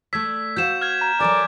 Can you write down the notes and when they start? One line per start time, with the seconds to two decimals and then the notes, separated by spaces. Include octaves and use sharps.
0.13 A3 D5 E6 G#6 B6
0.57 F#4 C5 F5 G6 E7
0.82 F6 G#6
1.01 A#5
1.20 F#3 A4 A#4 D5 G#5